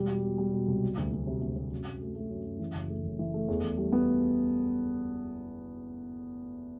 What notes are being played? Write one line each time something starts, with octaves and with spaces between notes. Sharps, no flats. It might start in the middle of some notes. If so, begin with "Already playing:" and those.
Already playing: E1 G3
B2
B2
G3
B2
C2
F#3
D2
D2
C3
D2
C3
F#2
F#3
A3
A3
F#2
F#2
E3
F#1
A3
F#1
E3
A3
E2
E2
G3
B3